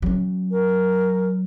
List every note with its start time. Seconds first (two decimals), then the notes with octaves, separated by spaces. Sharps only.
0.02 F#3 C#4
0.50 A#4